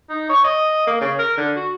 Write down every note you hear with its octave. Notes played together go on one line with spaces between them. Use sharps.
D#4
C#5
D#5
A#3
C#3
A#4
D3
F#4